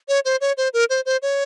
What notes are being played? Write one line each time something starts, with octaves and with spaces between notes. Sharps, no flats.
C#5
C5
C#5
C5
A#4
C5
C5
C#5